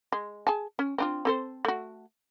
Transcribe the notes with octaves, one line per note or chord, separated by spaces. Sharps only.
G#3
G#4 G#5 A5
C#4
C4 D4 F4
C4 A4 C5
A3 F#4